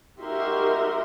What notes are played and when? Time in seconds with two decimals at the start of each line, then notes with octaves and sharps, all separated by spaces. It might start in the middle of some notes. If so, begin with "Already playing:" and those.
0.21 D#4 F#4 G4 A#4 E5 C6